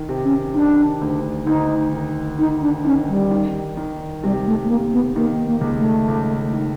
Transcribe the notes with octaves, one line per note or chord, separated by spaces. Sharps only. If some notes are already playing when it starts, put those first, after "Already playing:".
Already playing: D#3
C3
C#4
D#3 D4
D2
D2 D#4
D#3
D#3 D#4
D4
D#3 C#4
G3
D#3
D#3
C3 G3
A3
A3
C3 A#3
B3
D#3 A#3
A#3
C#2
A3
C#2
D#3